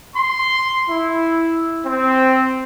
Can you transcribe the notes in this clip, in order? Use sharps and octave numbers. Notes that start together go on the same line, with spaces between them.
C6
E4
C4